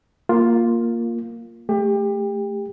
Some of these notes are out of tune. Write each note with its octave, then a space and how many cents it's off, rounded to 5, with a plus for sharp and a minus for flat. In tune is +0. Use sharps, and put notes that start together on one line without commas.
A#3 +0 F4 +5
A3 -5 G4 +30